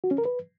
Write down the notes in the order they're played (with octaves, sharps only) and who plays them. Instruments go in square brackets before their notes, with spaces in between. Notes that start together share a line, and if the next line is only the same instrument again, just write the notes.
[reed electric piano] F#4
C#4
A#4
B4